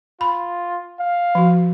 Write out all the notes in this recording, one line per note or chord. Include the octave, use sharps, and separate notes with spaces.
F4 B5
F5
F3 F#4